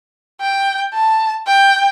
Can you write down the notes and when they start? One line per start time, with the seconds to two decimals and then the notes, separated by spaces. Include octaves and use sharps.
0.41 G5
0.94 A5
1.47 G5